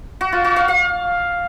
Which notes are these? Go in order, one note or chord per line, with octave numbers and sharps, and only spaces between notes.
F#4
F4
F#4
F5
F5